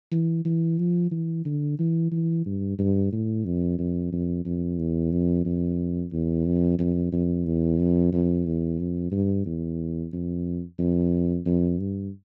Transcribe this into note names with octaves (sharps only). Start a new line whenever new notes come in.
E3
E3
F3
E3
D3
E3
E3
G2
G2
A2
F2
F2
F2
F2
E2
F2
F2
E2
F2
F2
F2
E2
F2
F2
E2
F2
G2
E2
F2
F2
F2
G2